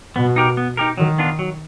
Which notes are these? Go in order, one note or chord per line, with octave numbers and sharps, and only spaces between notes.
B2 B3
D#4 G4 A#4
B3
D#4 G4 A#4
D#3 F#3
B3 D4 F4
F#3